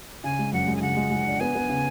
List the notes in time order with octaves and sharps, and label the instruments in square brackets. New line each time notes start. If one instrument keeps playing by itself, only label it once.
[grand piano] C#3 [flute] G#5
[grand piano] G#3
[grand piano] F#2 [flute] F#5
[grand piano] G#3
[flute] G#5
[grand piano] C#3 [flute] F#5
[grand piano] G#3
G#3
D4
[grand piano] B3 [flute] G#5
[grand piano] B3
C#3